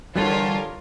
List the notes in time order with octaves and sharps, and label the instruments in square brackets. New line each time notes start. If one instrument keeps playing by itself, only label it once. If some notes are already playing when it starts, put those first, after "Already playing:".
[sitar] A#2 D3 [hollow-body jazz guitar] E3 G3 A4 [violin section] F4 A#4 C#5